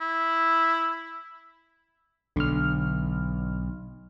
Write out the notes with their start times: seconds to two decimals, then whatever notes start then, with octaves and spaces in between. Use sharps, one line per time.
0.01 E4
2.36 B1 D3 F6